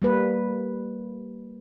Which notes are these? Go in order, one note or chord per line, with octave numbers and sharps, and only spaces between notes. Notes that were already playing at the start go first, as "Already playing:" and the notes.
G3 A#3 B4